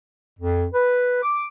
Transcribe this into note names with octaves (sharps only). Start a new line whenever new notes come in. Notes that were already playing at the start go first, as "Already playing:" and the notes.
F2
B4
D6